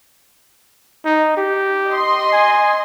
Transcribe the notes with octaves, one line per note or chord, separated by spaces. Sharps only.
D#4
G4
D#5 C6
G#5